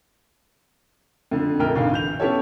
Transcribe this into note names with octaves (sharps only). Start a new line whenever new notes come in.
F2 D3
A#1 F2 A#4 G5 F6
B1 G2 D3 F5
E3 G6 F7
B3 C#4 E4 G4 A4 C#5